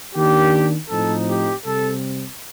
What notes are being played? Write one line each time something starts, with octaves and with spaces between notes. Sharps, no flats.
D#3 A#3 D4 G4
A2 F3 C4 D#4 A4
G4
C3 G3 C4 A4